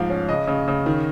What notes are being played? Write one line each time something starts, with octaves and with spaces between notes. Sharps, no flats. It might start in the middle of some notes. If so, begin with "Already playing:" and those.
Already playing: G#2 F3 F5
C#4
C#3 D#5
C#3
C#3
D#3